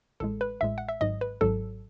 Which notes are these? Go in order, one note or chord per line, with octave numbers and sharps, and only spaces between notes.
A1 A2 G#3 A4
B4
A1 A2 G#3 E5
F#5
E5
G#1 G#2 F#3 D#5
B4
G#1 G#2 F#3 A4